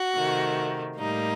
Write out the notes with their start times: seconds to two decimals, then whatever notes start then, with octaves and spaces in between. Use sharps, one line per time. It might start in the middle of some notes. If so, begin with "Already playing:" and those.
Already playing: F#4
0.15 C3 D#3 A3
0.98 A2 G3 A#3 D#4